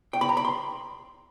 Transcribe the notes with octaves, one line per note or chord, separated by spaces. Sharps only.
G5
B5
A#5
B5
C6